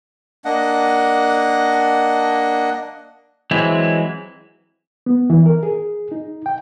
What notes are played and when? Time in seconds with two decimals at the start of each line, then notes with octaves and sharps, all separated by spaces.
0.45 A#3 D4 D#5 F#5
3.51 E3 F#3 G#3 C4 E4
5.06 B3
5.30 E3
5.46 A#4
5.63 G#4
6.12 D#4
6.46 G5